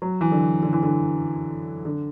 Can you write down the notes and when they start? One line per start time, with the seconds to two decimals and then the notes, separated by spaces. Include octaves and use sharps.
0.02 F#3
0.21 E3
0.32 D3
0.63 D3
0.73 E3
0.83 D3
1.85 D3